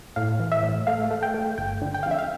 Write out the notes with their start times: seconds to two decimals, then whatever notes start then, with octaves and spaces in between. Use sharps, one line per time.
0.16 A2 F5
0.39 E3
0.52 E5
0.63 A2
0.87 A3 F5
1.11 A3
1.23 G5
1.34 A3
1.58 G1 G5
1.82 D3
1.94 G5
2.03 F2 F5
2.11 E5
2.19 F5